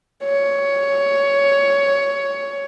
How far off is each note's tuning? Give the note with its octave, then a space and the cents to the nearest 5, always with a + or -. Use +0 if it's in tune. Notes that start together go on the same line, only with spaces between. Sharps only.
C#5 +10